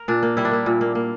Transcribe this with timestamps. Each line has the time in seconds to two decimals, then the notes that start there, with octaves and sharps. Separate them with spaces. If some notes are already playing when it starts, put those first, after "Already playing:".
Already playing: A#4
0.08 A#2 D4
0.23 A#3
0.37 G3 E4
0.45 D4
0.51 A#3 E4
0.66 A#2
0.81 A#3
0.95 A#3